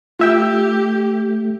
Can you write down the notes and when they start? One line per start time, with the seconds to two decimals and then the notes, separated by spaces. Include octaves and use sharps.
0.19 A3 F4 G4 E5 G5